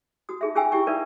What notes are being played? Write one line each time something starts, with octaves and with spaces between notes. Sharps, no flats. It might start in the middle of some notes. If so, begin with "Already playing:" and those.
F#4 D#6
D#4 G#4 E5
C#4 F4 G#4 G5 G#5 E6
E4 G4 G5 C#6
D#4 A#4 B4 D5 E5 F5